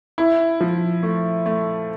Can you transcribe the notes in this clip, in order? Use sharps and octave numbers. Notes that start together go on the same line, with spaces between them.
E4
F3
A3
A3